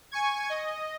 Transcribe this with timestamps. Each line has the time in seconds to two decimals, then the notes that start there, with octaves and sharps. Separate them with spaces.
0.12 G#5 C#6 G#6
0.50 D#5